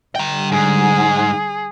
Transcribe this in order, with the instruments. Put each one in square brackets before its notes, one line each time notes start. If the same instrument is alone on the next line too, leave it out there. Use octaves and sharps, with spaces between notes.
[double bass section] D3 G3 [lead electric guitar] G5 A#5
[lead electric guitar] G#2 [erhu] G#4